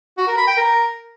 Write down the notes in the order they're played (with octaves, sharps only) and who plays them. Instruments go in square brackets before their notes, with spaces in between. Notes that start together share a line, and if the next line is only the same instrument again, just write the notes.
[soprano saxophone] F#4
A#4
B5
G5
A#4